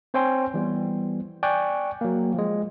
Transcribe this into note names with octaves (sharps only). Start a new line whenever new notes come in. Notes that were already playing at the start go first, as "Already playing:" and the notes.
C4 C5 C#5 G5 G#5 C6
E3 G3 B3
D5 G5 G#5 C#6 F#6
F#3 A#3
F3 G#3